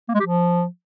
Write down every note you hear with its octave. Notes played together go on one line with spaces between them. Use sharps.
A#3
G#3
G4
F3